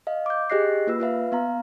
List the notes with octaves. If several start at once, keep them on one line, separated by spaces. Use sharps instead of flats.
D#5 F5
D6 G6
G4 G#4 D#5 F#6 A#6 C7
A#3 F4 B4 E6
F4 B4 E5 F5
B3 F5 A#5